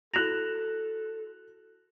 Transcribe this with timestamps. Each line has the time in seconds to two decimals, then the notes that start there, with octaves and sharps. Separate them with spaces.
0.14 E4 F#4 A4 F#6 A#6 E7 F7